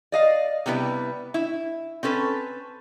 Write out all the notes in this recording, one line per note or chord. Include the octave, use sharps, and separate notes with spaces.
D5 D#5 F5
C3 G3 B3 E4 B4
E4
C4 C#4 A4 B4